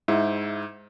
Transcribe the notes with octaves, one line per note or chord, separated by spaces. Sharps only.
G#2 E4